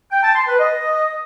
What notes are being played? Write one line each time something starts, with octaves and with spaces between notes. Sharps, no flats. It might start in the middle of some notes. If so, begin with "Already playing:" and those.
G5
A5
C6
B4
D#5